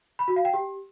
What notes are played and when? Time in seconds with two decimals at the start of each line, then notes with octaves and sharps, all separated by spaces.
0.19 B5
0.28 F#4
0.36 F5
0.45 G5
0.54 G4